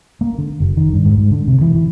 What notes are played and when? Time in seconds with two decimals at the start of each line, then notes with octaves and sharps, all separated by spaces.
0.21 A#3
0.38 D3
0.60 F#1
0.77 D#3
0.93 G2
1.05 G#2
1.18 G#2
1.31 D3
1.48 C3
1.61 E3
1.75 E3